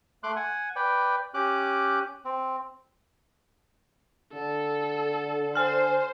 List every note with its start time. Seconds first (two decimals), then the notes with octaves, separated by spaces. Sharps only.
0.23 A3 C6 D6 F#6
0.36 F#5 G#5
0.76 B4 D5 G5
1.34 C#4 G4 D6 F#6
2.25 C4
4.33 D3 A4
5.55 C5 G#5 F6